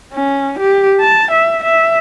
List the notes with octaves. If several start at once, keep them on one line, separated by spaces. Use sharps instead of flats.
C#4
G4
A5
E5
E5